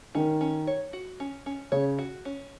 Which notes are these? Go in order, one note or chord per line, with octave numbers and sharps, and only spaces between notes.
D#3 C#4
C#4
C#5
F#4
C#4
C#4
C#3 C#5
F#4
C#4